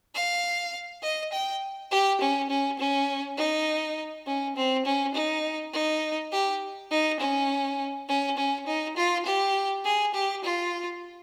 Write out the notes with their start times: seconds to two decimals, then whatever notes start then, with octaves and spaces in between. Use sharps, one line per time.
0.15 F5
1.03 D#5
1.32 G5
1.92 G4
2.21 C#4
2.50 C#4
2.79 C#4
3.38 D#4
4.27 C#4
4.56 C4
4.85 C#4
5.15 D#4
5.73 D#4
6.32 G4
6.91 D#4
7.20 C#4
8.09 C#4
8.37 C#4
8.67 D#4
8.97 F4
9.26 G4
9.85 G#4
10.14 G4
10.44 F4